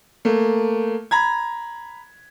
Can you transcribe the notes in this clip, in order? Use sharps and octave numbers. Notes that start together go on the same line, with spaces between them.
A3 A#3
A#5 B5 G#6